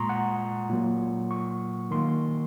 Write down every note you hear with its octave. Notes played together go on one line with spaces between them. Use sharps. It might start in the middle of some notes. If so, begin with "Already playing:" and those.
Already playing: A#2 G#3 A#5 C6 C#6 D#6
F#5
A#2 F#3 A#3
C#6
D#3 A#3 C6